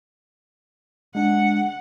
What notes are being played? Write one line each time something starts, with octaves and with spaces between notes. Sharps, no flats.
G#3 D4 F#5